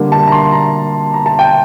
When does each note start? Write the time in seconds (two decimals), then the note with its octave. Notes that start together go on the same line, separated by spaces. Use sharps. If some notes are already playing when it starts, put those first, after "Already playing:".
Already playing: D3 G3 A#3
0.12 A5
0.27 A#5
0.32 C6
0.52 A#5
1.14 A#5
1.26 A5
1.39 G5